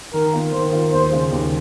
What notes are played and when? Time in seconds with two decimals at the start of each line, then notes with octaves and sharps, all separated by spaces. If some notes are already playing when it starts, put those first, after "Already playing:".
0.13 D#3 A#4
0.33 A#3 F4 A#4
0.53 D#3 C5
0.72 A#3 F4 A#4
0.92 D#2 C5
1.11 C#3 G#3
1.31 D#2